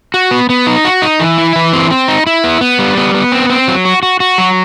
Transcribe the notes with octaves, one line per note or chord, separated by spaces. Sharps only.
F#4
B3
B3
D#4
F#4
D#4
E3
E4
E3
C4
C4
D#4
E4
B3
B3
G3
B3
B3
C4
C4
F#3
F#4
F#4
F#4
F#3